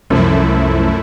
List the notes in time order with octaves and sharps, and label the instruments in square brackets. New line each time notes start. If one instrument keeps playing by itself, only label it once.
[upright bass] C2 [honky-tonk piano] F#2 F3 [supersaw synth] A3 E4